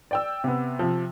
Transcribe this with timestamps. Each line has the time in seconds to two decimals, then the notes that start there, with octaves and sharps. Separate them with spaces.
0.11 D5 G5 E6
0.44 C3 B3
0.79 C3 F3